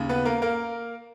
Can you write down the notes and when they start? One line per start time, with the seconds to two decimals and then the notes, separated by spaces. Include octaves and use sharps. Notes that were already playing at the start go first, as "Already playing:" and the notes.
Already playing: D#2 C#3
0.09 B3 B4
0.25 A#3 A#4
0.42 A#3 A#4